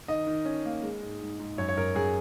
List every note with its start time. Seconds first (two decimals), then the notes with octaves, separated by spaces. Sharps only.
0.08 D#3 D#5
0.27 D#3
0.45 C#4
0.65 A#3
0.83 G#3
1.02 G#2
1.21 G#2
1.39 G#2
1.58 F#2 C#5
1.68 C#5
1.77 F#2 A#4
1.95 F#2 G#4